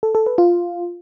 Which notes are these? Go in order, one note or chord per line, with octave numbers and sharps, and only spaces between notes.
A4
A4
B4
F4